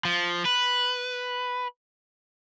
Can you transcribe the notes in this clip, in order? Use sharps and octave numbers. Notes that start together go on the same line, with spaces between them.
F3
B4